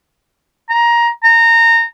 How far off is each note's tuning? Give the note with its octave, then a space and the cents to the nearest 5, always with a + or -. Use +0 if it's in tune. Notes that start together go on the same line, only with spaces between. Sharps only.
A#5 +15
A#5 -20